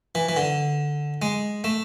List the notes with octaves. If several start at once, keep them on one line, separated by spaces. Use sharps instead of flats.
E3
E3
D3
G#3
A3